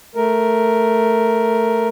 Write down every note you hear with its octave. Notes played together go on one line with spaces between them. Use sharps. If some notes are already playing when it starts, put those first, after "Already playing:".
A3 A#4